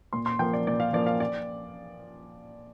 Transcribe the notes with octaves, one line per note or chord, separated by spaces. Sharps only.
A#2 C6
C6
F3 A#3 G5
D5
A#2 D5
F5
F3 A#3 D5
F5
D5